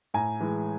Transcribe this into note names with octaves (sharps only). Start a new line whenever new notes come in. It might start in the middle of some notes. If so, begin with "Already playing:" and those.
A2 G#5 A#5
E3 G#3